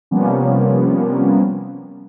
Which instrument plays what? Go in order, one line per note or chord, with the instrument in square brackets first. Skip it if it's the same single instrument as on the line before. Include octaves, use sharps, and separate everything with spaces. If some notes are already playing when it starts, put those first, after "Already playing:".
[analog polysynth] C3 F3 G3 A#3 B3 C#4